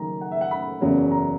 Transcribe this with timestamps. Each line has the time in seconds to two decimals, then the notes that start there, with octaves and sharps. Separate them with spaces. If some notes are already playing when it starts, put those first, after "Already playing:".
Already playing: F#1 F#2 D#3 A#5
0.21 F#5
0.31 E5
0.41 F#5
0.51 B5
0.81 F#1 E2 C#3 F#3 C#4
1.11 A#5